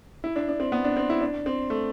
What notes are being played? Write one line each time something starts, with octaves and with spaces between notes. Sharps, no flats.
E4
D4
D4
C4
B3
D4
C4
E4
D4
C4
A3